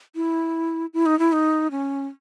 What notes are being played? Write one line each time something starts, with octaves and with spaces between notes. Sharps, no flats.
E4
E4
D#4
E4
D#4
C#4